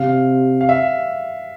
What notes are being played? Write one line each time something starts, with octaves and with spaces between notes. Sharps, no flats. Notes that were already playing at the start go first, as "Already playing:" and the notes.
Already playing: C3 F5
F5
E5